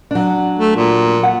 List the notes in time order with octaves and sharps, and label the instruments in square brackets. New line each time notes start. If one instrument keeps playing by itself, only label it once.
[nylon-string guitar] F#3 D4
[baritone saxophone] A3
A#2
[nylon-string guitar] F#5